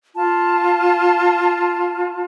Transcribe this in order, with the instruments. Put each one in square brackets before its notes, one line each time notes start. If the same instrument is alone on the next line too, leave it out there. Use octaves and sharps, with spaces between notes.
[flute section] F4 A5